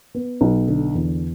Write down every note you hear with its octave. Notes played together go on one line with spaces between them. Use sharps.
B3
B1
D3
E2